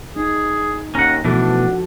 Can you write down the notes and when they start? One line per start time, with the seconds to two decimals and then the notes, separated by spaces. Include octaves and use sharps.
0.16 D#4 G#4
0.95 D#2 C#4 F#5 A#5
1.25 B2 E3 F3 A3 D4 F#4 A4